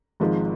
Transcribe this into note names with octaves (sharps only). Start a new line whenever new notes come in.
G#1 G#2 F3 G#3